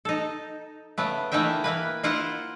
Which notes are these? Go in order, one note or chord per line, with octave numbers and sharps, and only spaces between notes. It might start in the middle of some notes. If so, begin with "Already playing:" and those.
D#4 A4
C#3 A3 B3
E3 A3 A#3 D#4 E5 G5
E3 A#3 B4
A#3 E4 F4 C5 F#5